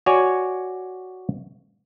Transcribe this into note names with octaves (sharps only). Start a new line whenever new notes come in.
F#4 C#5 D5 G#5